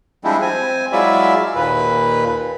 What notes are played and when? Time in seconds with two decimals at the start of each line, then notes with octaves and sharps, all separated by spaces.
0.24 F3 G3 G#3 C4 D4 E4
0.41 C4 G#5
0.92 F#3 G#3 E4 F4 D5 E5
1.55 D#2 A#2 B4